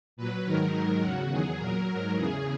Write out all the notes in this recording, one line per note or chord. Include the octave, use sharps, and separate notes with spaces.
A#2 F#3 B4
G#2 D#3 F#3 A#4
G#2 D#3 F#3
E2 C#3 F#3 F#4
E2 D#3 F#3 G#4
A#2 F#3 A#4
G#2 F#3
E2 C#3 E3 G#4